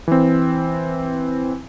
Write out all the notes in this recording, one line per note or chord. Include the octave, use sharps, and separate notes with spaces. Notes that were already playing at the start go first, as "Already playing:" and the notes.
E3 C4